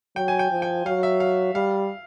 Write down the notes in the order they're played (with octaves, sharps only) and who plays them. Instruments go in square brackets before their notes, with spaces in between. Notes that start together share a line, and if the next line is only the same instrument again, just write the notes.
[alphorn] F#3 [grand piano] G5
[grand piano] G#5
G5
[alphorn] F3
[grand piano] G5
[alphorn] F#3 [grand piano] F5
[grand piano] E5
F5
[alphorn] G3 [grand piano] F5